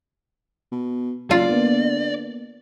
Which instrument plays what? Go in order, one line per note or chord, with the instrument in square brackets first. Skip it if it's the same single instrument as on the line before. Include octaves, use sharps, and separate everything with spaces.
[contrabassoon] B2
[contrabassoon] F#1 [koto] F4 [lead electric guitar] D5 [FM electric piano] C6
[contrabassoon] D3 [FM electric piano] A#3 B3